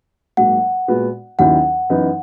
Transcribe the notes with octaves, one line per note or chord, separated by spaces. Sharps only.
G#2 F#3 A#3 F#5
A#2 G#3 B3 F#4
D#2 D#3 F#3 C#4 E4 F#5
F#2 E3 B3 D#4